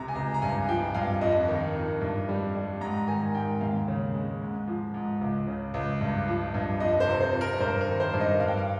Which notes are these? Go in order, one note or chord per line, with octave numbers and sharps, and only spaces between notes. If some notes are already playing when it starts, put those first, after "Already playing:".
Already playing: C#2 C3 A#5
G#5
C#2 A#5
A#5
G2 G#5
F3 G5
G2 F5
F2 D#5
D#3
F2
G2
G3
G3
G#2 A#5
D#3 G#5
G#2 G5
D#2 F5
C#3
G#3
G#2
F3
G#2
C#2
C#3
C#2
G2
F3
G2
F2 D#5
C5
C3
C5
F2
A#4
G2 C5
A#4
D#3
C5
G2
D#5
G2 F5
G5
F5